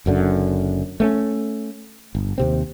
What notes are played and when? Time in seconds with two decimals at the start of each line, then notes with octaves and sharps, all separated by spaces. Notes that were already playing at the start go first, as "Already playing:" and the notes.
0.06 F#1 F#2 D3
1.00 A3 A#3 C#4
2.15 G1
2.38 D#2 C3 C4